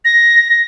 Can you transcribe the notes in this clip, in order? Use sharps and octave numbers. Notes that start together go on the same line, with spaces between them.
A#6